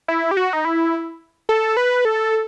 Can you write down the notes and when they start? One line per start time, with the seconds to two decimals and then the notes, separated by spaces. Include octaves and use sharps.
0.08 E4
0.31 G4
0.37 F#4
0.53 D#4
0.65 E4
1.49 A4
1.77 B4
2.05 A4